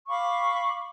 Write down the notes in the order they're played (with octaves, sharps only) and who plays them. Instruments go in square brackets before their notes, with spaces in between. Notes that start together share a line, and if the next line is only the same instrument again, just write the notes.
[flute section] F5 B5 C#6 D6